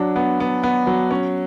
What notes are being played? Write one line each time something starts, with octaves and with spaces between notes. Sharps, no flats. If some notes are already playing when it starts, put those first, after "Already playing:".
Already playing: F#3 D4
B3
B3
B3
F#3
C#4